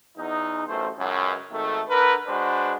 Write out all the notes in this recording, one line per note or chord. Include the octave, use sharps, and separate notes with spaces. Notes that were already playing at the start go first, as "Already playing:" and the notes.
E2 D#4
A1 F#2 A3 C5
C#2 F#2
G#1 D#3 A3
D3 A#4 B4
G#3 D4 F#4 B4 C5